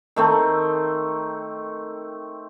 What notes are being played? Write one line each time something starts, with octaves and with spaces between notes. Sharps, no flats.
D#3 A3 C4